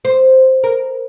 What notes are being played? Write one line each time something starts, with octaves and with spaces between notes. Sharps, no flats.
C5
A#4